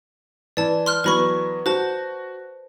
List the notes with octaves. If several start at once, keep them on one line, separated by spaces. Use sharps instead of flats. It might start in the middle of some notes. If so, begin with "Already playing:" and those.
E3 D5 A5
C6 F6 F#6
E3 F#3 B3 B4 B5 C#6
F#4 C5 A5